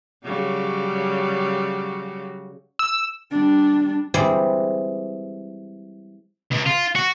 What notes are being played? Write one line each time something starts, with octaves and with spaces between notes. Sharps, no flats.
C#3 F#3 G3
E6
G3 D4
E3 G3 G#3 C4 G#4 D5
C#2
F4
F#4